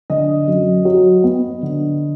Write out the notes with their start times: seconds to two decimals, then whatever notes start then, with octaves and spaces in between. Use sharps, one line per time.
0.10 D3 D#5
0.48 F#2
0.85 F#3
1.24 B3
1.62 D3